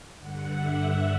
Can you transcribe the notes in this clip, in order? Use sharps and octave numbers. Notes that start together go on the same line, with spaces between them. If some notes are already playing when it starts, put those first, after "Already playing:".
G2 D3 F#5
E5